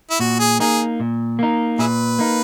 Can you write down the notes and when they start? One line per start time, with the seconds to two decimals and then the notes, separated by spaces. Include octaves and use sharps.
0.11 E4
0.20 A#2 F#4
0.39 G#4
0.60 A#3 D#4 G#4
1.00 A#2
1.39 A#3 D#4
1.79 A#2 E4 G#4 B4
2.19 A#3 D#4